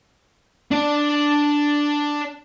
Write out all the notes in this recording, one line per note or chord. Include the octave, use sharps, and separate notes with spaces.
D4 D5